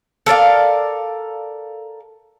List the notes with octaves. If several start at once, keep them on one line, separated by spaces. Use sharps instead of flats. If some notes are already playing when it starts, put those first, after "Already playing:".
A4 A#4 D5 F5